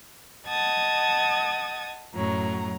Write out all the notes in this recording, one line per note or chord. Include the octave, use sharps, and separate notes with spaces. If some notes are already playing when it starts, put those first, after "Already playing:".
D#5 F#5 A5 D#6 G#6 A6
F#2 A2 F#3 A#5